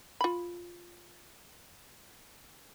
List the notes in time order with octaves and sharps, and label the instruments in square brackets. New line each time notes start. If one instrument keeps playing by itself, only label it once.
[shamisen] F4 B5